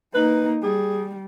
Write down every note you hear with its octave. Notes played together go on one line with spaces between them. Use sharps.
A#3 D#4 B4
G3 G#4